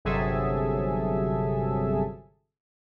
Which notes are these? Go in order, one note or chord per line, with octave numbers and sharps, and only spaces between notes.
G1 C3 F#3 G#4 A4 E5